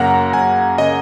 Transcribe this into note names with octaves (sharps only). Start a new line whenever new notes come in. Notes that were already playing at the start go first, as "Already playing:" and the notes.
Already playing: F#2 C#3 A#3 F#5 A#5
F#2 G#5
C#3 A#3 D#5